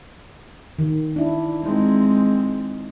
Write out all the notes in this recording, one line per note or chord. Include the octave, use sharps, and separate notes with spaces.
D#3
D4 E4
G#3 C4 D#4